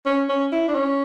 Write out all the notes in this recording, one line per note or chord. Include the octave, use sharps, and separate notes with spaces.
C#4
C#4
E4
D4
C#4